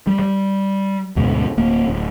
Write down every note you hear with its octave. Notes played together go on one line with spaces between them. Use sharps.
G3
G3
D2 G#2 B2
D1 A#3
D1